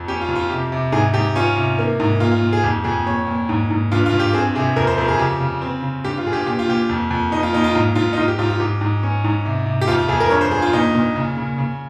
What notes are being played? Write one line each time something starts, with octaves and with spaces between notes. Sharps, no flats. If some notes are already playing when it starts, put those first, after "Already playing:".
Already playing: F2
C#4 G4
F4
F2
F4
C3 G4
C3
G#2 G#4
G#2 G4
C#4 F4
C3
A#3
G#2
A#2 F4
F4
A#2
G#4
F2 G4
F2 G#4
A#2 C#5
A#2
G#2
G#2
G2 F4
F4
G2
G4
C4 G#4
C3 G#4
F2 A#4
C5
F2 A#4
G#4
C#3 G4
C#3
C4
C#3
G2 G4
F4
G2 G#4
G4
A#2 G4
F4
A#2 G4
F2
F2
A#2 D#4
F4
A#2 D#4
F4
G#2 F4
G#2 F4
D#4
G#2 F4
G4
G#2 F4
F4
G#2 G4
G#2
C#4
G#2
C3
C3
G4
F2 F4
F4
F2 G#4
A#4
G2 C#5
C5
G2 G#4
F4
A#2 D#4
A#2
C#3
C#3
C#3